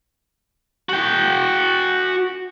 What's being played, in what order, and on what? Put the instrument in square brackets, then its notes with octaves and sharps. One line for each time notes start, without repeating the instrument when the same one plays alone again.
[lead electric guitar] F#4 G5